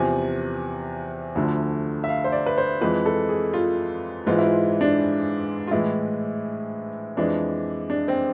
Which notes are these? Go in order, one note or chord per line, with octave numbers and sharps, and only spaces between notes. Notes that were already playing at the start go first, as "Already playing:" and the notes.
Already playing: E2 C3 F3 G#5
D2 D3 F3 A3
E5
F5
C5
D5
B4
C5
F2 E3 G#3 B4
A4
G#4
F4
G#2 E3 G#3 F4
E4
F4
D4
F4
A2 E3 G#3 E4
F2 E3 G#3 D4
D4
C4